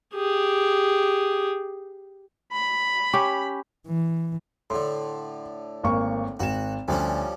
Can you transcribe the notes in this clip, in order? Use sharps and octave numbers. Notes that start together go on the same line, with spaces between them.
G4 G#4
B5
C#4 G4
E3
A2 D3 C6
G#1 A#3 C#6
G#1 F#4 E7
D2 F3 G3 C#4